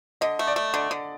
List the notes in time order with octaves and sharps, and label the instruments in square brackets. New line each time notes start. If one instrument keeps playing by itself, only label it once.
[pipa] D3 [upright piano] D#5
[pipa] A3
[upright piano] D5
[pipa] A3
[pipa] D3 [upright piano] D5
[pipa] D3